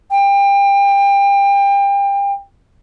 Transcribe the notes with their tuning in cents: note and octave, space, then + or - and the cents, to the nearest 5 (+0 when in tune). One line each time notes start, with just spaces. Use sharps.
G5 +30